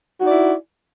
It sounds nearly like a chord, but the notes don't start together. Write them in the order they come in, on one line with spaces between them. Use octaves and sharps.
F#4 D#4 D5 E4